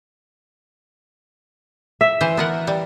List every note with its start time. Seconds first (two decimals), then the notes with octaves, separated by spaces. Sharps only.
2.01 E5
2.21 E3 C5
2.37 B3 A#4 F#5
2.67 G3